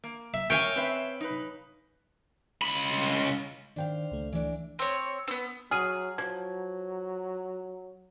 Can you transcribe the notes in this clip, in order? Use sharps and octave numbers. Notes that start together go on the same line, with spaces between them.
A#3
E5
A#4 C#5 E5 F5 G5 G#5
C4 B4 E5
D#4 B4
C#2 B5
D#3 D4 C5 F5 G5
C#2 A3
E3 D4
C4 C#5
B3 C4
F#3 G#4 F6 D#7
F3 F#3 G#6